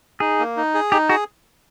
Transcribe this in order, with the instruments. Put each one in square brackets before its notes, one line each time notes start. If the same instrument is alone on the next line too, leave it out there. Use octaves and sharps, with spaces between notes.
[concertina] D#4 [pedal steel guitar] G#4
[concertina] A#3
D#4
G#4
[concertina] D#4 [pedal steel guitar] G4
[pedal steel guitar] F#4 [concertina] G#4